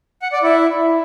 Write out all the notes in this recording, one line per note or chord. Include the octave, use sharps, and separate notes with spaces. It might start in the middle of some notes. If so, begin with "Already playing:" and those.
F#5
D5
E4